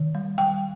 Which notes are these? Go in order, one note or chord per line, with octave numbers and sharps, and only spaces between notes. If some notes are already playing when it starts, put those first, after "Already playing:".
Already playing: D#3
G3
G3 G5